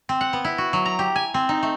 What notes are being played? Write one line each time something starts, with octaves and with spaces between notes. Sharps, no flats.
C4
F#5
B3
E4
F#4
F#3
A#5
G4
G#5
C4
D#4
A3